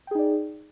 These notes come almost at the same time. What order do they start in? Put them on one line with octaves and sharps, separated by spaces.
G5 G#4 D#4 D5